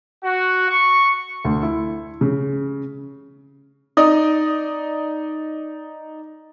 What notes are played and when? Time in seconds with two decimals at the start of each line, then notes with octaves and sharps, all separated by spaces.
0.24 F#4
0.70 C#6
1.45 D2
1.63 E4
2.21 C#3
3.97 D#4 D5 D#5 D#6